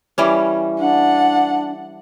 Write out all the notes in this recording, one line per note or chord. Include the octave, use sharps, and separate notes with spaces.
E3 G3 C#4
D4 F#5